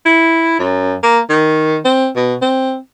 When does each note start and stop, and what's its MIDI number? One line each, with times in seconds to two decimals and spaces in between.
0.06 0.55 64
0.59 0.95 42
1.03 1.19 58
1.30 1.79 51
1.84 2.08 60
2.16 2.36 47
2.42 2.77 60